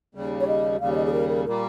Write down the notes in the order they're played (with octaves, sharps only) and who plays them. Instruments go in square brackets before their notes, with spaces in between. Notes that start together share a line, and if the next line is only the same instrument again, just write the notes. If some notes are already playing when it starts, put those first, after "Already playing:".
[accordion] D#2 C#3 G3
[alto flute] C#5
D#5
[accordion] D#2 C#3 G3 [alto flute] F5
[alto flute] C#5
D#5
G#4
A#4
A#4
[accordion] A#2 G3 A#3 [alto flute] A#4